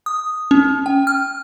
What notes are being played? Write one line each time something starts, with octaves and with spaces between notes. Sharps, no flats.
D#6
C#4
G5
F6